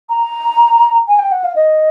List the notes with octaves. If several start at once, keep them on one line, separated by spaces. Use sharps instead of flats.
A#5
G#5
G5
F#5
F5
D#5